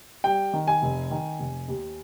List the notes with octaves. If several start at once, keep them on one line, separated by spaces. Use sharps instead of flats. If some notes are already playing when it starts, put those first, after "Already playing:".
G3 G5
D#3
G#5
F1
D#3
F1
D#2